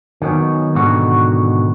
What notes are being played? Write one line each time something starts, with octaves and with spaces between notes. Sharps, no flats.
D#3 F#3 B3 C#4
G#2 B2 D3 D#3 F#4